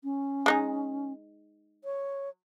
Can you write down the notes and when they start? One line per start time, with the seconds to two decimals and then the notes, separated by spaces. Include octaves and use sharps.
0.04 C#4
0.46 G#3 D#4 G#4
1.84 C#5